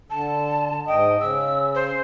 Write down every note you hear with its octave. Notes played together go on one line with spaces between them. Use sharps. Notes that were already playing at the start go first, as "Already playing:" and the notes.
D3 A5
G#2 D#5 G5
C#3 E6
C5